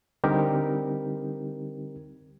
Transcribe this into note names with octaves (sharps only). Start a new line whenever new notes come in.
D3 G3 C4 D#4 G4 A#4